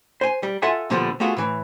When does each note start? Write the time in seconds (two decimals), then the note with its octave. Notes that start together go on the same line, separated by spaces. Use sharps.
0.21 C5 G#5
0.43 G3
0.62 F4 A4 E5 F#5 G#5
0.90 A#2 D3 F3 G3 B3
1.20 A3 B3 F4 F#4 G#4
1.37 A2 E3